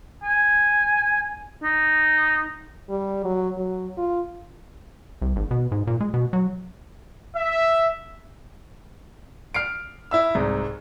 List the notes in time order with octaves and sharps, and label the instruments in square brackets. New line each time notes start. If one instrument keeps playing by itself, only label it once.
[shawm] G#5
D#4
[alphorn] G3
F#3
F#3
F4
[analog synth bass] C2
G#1
B2
G#2
A#2
G#3
B2
F#3
[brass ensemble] E5
[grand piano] F6 C7 D7
E4 E5 E6
C2 G#2